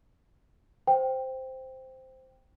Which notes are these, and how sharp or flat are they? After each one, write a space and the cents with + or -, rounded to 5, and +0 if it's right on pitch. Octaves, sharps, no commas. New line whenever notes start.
C5 -5 G5 +0